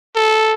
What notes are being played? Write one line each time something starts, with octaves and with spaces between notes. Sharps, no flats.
A4